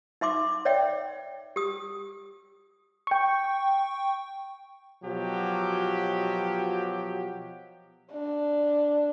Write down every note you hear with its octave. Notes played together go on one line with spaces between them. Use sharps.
D#4 E5 C6 D6
C#5 D5 E5 G5
G4 D#6
G5 C#6
B2 F3 F#3 G4
D4